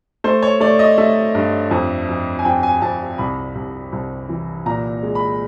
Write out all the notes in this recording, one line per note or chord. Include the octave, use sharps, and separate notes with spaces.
A3 C5
C#5
A3 D5
D#5
A3 E5
G2
F2
F3
G#5
F2 G5
G#5
F2 A5
C2 B5
C2
C2
E3
A#2 A#5
G#3
B5